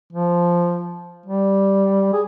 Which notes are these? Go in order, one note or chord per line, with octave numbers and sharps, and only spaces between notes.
F3
G3
G#4